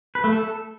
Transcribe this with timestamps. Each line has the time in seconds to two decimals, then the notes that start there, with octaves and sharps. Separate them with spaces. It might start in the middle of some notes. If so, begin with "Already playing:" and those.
0.15 B4
0.24 A3
0.33 A4